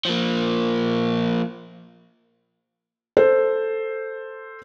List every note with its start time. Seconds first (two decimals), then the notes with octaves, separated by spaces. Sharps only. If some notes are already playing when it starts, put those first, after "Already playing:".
0.05 F3 A#3
3.17 A4 C5